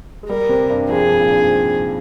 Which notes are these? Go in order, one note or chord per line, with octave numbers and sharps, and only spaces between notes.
G#3
G3 A#4
C3
G2
F2 G#4
G2
A#2
G2
G#2